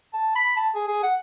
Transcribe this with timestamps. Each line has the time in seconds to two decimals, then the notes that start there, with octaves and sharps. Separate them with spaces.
0.13 A5
0.35 B5
0.56 A5
0.75 G#4
0.87 G#4
1.03 F#5